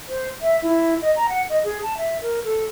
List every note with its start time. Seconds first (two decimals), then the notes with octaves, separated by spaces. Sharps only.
0.08 C5
0.42 E5
0.62 E4
1.02 D#5
1.16 A#5
1.29 F#5
1.49 D#5
1.64 G#4
1.82 A5
1.98 E5
2.21 A#4
2.44 A4